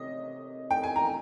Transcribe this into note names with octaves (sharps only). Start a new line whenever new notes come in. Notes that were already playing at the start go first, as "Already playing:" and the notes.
Already playing: C3 C#4 D#5
G5
G#5
A#5